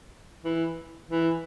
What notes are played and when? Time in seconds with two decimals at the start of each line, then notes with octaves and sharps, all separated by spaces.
0.45 E3
1.10 E3